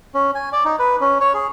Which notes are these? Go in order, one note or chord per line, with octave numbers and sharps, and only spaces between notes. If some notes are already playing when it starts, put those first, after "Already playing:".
C#4
G#5
D5
D#4
B4
C#4
C#5
G#4